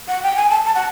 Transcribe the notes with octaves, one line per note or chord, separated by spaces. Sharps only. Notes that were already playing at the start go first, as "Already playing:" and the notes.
F#5
G5
G#5
A5
A5
F#5